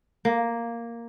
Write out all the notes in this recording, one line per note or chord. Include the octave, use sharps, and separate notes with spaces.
A#3